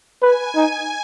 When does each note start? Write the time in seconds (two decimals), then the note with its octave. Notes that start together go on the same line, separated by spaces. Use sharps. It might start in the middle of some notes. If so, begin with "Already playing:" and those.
0.22 B4 G#5
0.56 D#4 G#5